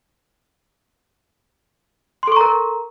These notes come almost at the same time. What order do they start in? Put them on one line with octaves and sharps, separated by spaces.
C6 A4 C#6 A#5 A#4